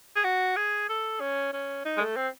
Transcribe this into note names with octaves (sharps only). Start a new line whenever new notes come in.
G#4
F#4
G#4
A4
C#4
C#4
D#4
G#3
A3
C4